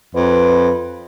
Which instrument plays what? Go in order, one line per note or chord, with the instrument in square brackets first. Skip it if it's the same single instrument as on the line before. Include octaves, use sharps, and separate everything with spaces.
[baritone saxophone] F2 [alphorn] B4